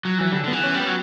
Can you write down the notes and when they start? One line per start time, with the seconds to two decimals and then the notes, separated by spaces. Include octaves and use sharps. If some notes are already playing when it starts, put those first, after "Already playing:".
0.05 F#3
0.18 E3 F#3
0.32 D3 G3
0.44 D3
0.48 E3 B3
0.64 C#4
0.74 G3
0.79 B3
0.87 F#3